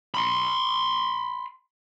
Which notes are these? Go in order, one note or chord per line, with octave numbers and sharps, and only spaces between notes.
B5 C6